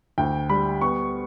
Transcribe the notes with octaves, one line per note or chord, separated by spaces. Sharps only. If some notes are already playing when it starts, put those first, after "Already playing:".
D2 G5
G3 B5
B3 C#6